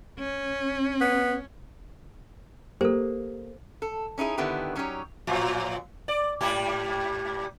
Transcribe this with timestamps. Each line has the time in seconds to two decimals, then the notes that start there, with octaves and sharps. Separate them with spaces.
0.19 C#4
1.01 B3
2.81 A#3 G4 A4 C5
3.82 A4
4.18 C#4 D#4 E4 G#4
4.38 D3 D#3 B3 E4 G4
4.76 F#3 C#4 D#4 G4 C#5 D5
5.27 A2 F3 F#3
6.08 D5
6.41 G#2 G3 G4